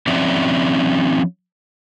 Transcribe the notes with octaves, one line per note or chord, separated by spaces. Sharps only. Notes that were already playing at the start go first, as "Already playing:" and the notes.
F3 C4 C#4 D#4 D5 E5